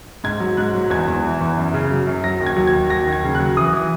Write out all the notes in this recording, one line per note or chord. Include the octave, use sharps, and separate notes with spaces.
G#2 G#6
F#3
G#2 F#6
F#3
E2 G#6
E2
E3
E2
F#2
C#3
F#3
F#2
F#3 A#6
D#2
G#6
F#3
G#6
D#2
F#3 A#6
D#2
G#6
C#3
F#6
F#3
E3 D#6
E3